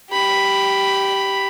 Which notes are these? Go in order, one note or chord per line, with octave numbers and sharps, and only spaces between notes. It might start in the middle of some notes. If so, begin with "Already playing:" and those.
G4 B5